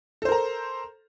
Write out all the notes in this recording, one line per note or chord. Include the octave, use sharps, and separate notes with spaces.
A4 A#4 C5 A#5